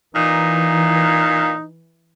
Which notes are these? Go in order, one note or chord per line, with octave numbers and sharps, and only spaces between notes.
A#2 E3 D#4